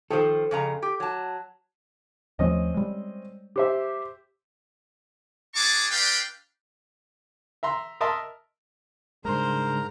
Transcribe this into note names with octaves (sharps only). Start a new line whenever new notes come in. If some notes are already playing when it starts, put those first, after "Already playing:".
D#3 F3 A4 C5
F2 C#3 A#5
G4
F#3 A5
D#2 F3 A3 C4 C#4 D#5
G3 G#3
G4 C5 E5
D4 E4 G#4 A5 C#6 D6
D4 B4 D5 F5 G5
E5 A#5 C6
A#4 D#5 E5 A5 C6 D#6
G#2 C#3 G3 G#3 D4 A#4 C5 A#5